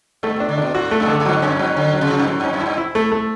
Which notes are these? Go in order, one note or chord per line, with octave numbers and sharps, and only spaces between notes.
G2 A3
B2 D4
D3
B2 D4
A2 F#4
A3
F#2
D3
F#2
G2 F#3
F#2 C#4
G2 F#3
D3 C#4
F#3
C#3
F#3
G2
A2 F#3
G2 C#4
F#2
G2 E4
E4
A3
A3